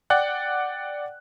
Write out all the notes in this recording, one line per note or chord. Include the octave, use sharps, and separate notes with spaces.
D5 F#5 G5 F#6